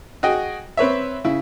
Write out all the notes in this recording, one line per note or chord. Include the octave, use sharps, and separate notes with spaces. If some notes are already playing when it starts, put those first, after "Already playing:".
F#4 G#4 D#5 G5
C4 B4 C#5 E5
C#3 E4